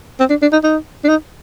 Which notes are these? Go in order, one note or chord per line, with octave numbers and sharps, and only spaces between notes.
C4
D4
D4
D#4
D#4
D4
D#4